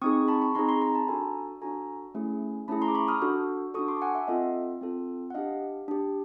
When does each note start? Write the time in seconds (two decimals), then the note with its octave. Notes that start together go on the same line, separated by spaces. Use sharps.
0.02 C4 D#4 G#4 C#6 D#6
0.28 A5 B5
0.42 B5 C#6
0.55 C4 D#4 G#4 A#5 C6
0.69 A#5 C6
0.82 A#5 C6
0.95 A5 B5
1.08 D4 F#4 A4 G#5 A#5
1.61 D4 F#4 A4 G#5 A#5
2.15 A3 C#4 E4 G#4
2.68 A3 C#4 E4 G#4 A5 B5
2.82 A#5 C6
2.88 D6
2.95 B5 C#6
3.08 D#6 F6
3.22 D4 F#4 A4
3.74 D4 F#4 A4 C#6 D#6
3.88 C6 D6
3.97 A5
4.02 F#5 G#5
4.15 E5 F#5
4.27 C4 F4 A4 D#5 F5
4.81 C4 F4 A4
5.30 F#5
5.34 D4 G4 D#5 F5
5.88 D4 G4